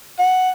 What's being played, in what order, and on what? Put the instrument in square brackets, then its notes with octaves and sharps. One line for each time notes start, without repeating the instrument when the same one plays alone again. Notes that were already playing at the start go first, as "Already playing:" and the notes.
[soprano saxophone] F#5